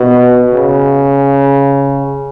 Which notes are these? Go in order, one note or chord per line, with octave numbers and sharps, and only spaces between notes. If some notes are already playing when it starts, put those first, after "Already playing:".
Already playing: B2
C#3